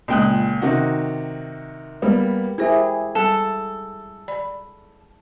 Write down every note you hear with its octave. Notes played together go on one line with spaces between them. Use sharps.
C#2 A#2 G5 D#6 F#6
C3 D#3 D#4 F#4
G3 A#3 B3
E4 G4 G#4 A#4 C5 E5
G3 A4
D5 B5